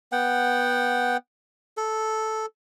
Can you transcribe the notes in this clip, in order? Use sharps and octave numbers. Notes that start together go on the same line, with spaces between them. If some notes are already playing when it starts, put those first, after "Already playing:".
B3 F#5 G5
A4